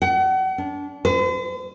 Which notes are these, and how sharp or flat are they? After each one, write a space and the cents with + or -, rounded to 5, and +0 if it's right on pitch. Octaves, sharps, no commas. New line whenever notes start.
F#5 +35
D4 -30
C5 -45